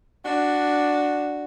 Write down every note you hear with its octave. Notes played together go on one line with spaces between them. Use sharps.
D4 F#4